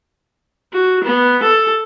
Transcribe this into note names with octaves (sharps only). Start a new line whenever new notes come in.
F#4
B3
A4